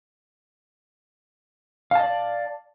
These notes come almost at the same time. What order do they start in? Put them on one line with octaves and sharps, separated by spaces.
F5 A5 D#5 D5